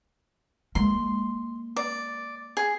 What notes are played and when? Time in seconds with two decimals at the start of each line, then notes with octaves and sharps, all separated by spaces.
0.75 G#3 A#3 C6
1.76 D5
2.57 G#4